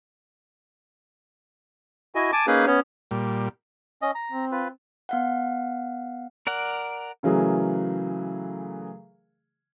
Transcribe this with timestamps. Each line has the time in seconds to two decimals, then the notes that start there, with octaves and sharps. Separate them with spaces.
2.15 E4 F#4 D#5 G#5
2.32 G#5 A5 D6
2.47 A#3 C#4 D#4 G#4 B4
2.67 B3 C#4 C#5
3.11 A#2 G3
4.02 C#4 D#5
4.15 A#5
4.32 C4
4.52 F4 B4
5.09 B3 F5 F#5
6.47 A#4 D5 F#5
7.23 C#3 E3 F#3 A3 G#4 A#4